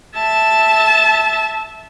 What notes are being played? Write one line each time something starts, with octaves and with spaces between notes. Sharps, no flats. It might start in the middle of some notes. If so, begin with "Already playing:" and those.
E5 A5